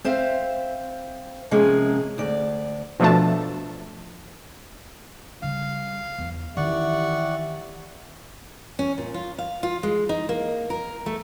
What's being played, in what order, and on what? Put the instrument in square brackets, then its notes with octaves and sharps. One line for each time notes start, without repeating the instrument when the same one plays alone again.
[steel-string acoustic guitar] C4 C5 E5 F5
C3 F3 G#3 A#3 C#4
D2 D5
[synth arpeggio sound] B2 F3 A3 D4 A5
[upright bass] C#3 G3 [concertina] F5
[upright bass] E2 E3
[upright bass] D#3 C#4 [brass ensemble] E3 G4 E5 [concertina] D5 F#5 C#6
[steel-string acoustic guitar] C#4
A#2
F4
F5
F4
G#3
D#4
A#3
A#4
A3